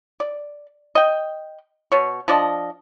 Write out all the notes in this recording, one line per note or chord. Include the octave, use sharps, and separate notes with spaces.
D5
D#5 G5
B2 C#5
F3 D4 D5 D#5